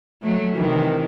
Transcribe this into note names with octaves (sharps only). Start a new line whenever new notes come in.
F#3 A3
C3 D#3 E3